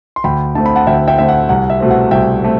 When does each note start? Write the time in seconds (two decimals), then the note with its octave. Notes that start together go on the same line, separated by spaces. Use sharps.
0.16 C6
0.24 D2 G5 B5
0.55 D3 A3 C4 A5
0.66 B5
0.76 F#5 A5
0.87 D2 E5 G5
1.08 E5 G5
1.18 D3 A3 C4 E5
1.28 F#5
1.49 C2 F#5
1.70 E5
1.80 B2 A3 C4
1.91 F#5
2.11 C2 E5 G5
2.42 A3 C4